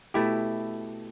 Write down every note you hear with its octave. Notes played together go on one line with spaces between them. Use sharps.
B2 A3 E4 G4